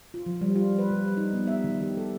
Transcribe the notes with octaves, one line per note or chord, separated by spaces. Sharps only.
F4
F3
G3
F4
B4
G3
D#4
B3
E5
D#3
G4
A4